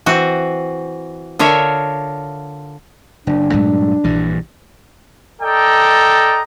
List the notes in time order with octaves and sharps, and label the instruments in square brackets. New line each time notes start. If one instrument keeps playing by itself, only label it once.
[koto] E3 C4 F#4
D3 F4 A#4 C#5 E5
[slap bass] F#1 [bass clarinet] D4
[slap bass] G2 F#3 A3 [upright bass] A#2 G#3
[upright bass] A#1 [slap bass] G2 E3
[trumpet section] A4 D5 D#5 G5 A#5